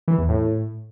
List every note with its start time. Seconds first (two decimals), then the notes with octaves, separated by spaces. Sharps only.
0.08 E3
0.18 E2
0.29 A2